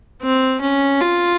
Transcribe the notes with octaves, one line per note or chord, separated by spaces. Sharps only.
C4
C#4
F4